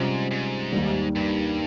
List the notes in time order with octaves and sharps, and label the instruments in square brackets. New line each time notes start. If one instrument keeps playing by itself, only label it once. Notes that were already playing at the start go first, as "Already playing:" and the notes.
Already playing: [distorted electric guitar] G#2 [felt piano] C3 G3 C#4 F4 C5
[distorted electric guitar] G#2
[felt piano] D#2 D#3 G3
[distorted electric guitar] G2